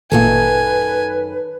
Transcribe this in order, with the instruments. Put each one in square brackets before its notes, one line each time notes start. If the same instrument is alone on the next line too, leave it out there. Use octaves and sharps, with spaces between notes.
[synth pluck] G#1 A#2 A#3 [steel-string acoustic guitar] F#2 D#3 A4 [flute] B4 [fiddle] G#5